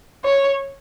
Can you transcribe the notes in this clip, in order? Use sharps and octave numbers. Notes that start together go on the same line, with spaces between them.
C#5